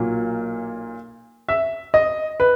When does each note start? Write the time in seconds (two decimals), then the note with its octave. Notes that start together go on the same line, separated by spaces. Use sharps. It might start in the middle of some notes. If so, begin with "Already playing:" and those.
Already playing: B1 A#2 F#3 A#3
1.49 E5
1.94 D#5
2.40 B4